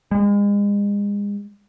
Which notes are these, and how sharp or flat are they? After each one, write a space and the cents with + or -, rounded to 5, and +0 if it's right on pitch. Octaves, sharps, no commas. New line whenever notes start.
G#3 -35